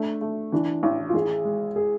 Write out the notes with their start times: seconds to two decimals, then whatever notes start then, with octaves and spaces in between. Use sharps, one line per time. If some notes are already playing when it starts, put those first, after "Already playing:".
Already playing: A3 D4
0.21 A3
0.52 E3 D4
0.83 A1
1.09 F4
1.14 A1 G#4
1.45 G#3
1.76 G#4